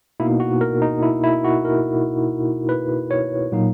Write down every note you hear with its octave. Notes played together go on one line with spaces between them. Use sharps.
B2 A#3 D#4 E4
F#4
A#4
D#4
E4
E4
F#4
A#4
B4
C#5
A#2 F#3 A#3 D#4